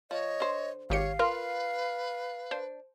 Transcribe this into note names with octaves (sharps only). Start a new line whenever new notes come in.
F3 C#5 D#5
D3 C5
G#1 G4 C#5 F5 C#7
F4 A#4 B4
D4 C5